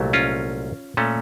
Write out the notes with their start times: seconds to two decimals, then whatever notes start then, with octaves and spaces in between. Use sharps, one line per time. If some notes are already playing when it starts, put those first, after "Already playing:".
Already playing: C2 A#2 F#3 A3
0.13 C#4 F4
0.97 A#2 A3 C#4